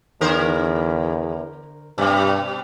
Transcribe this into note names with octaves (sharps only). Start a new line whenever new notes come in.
E2 D3 A#4 C5
G2 B2 G3